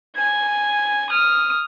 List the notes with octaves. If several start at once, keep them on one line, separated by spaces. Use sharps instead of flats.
G#5 G#6
D#6 F6